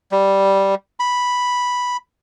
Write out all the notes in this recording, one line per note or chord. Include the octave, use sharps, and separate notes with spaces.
G3
B5